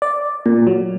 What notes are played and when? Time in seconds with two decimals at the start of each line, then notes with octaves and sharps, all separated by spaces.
0.02 D5
0.46 A#2
0.67 F#3